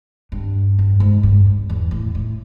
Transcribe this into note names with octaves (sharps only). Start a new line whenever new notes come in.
G2
G2
G#2
G2
F2
E2
A2
A2